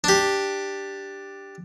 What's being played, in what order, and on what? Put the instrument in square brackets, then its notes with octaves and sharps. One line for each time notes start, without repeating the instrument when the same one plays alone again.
[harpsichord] D4 G4